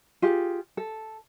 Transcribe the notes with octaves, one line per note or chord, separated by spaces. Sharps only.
F4 G4 G#4
A4